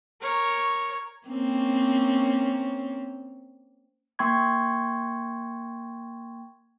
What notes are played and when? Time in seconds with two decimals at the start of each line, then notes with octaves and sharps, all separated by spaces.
0.21 A#4 C#5
1.27 A#3 C4 C#4
4.19 A#3 G5 C6 C#6 G#6